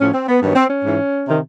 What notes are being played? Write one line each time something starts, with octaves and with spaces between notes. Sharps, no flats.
A2 F3 C#4
C4
B3
G2 D#3 F#3 B3
C4
C#4
G#2 E3
C3 D#3